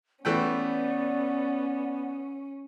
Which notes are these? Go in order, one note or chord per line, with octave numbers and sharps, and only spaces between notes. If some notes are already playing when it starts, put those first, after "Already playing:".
E3 A3 B3 C#4 D5 G5